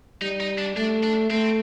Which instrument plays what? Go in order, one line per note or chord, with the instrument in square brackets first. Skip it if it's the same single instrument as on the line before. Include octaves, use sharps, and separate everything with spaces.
[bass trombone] G3 [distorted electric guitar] D#4
[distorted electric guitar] D#4
D4
[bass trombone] A3 [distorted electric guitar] D4
[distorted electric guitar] D4
[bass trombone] A3 [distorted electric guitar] C4